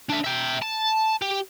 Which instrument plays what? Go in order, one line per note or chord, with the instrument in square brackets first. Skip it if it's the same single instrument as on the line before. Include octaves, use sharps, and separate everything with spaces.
[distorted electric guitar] D4 E5
E5 G5
A5
G4